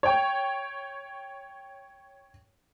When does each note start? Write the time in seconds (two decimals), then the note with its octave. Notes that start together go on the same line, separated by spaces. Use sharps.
0.03 C#5 G5